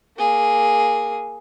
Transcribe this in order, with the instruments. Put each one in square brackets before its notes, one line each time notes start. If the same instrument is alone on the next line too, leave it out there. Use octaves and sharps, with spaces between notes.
[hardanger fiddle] A#3 G#4